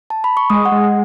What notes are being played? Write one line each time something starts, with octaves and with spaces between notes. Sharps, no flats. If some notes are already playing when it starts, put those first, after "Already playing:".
A5
B5
C#6
G#3 D#6
F#5
G#3